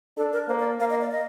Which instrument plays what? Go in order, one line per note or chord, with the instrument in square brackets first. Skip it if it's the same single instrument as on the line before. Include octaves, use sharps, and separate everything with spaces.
[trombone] D4 [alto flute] A4
[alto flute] A#4
[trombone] A#3 [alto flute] C5
[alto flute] D5
[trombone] A#3 [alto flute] F5
[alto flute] D#5
D5
D#5